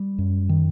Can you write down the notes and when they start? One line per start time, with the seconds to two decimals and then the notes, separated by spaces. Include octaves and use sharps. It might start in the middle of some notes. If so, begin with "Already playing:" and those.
Already playing: G3
0.18 F#2
0.49 D#3